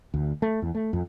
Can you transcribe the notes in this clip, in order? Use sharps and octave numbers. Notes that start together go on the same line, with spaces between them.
D2
A3
E2
A3
F2